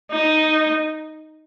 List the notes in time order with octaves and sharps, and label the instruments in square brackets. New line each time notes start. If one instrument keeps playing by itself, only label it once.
[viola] D#4